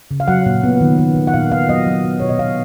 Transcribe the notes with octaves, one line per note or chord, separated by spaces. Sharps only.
C#3
F5
F#3 F#5
A#2
B3
D#3
D#3
D#3
F#5
A#2 F5
B3 F5
F#3 D#5
F#3
B3
B2 C#5
D#5
B3 F5